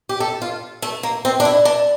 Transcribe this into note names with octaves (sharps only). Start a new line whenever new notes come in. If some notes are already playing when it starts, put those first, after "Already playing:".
G4
A4
F4
A3
A#3
C4
D4
E4
D4